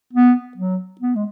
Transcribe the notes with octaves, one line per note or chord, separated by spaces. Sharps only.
B3
F#3
B3
G#3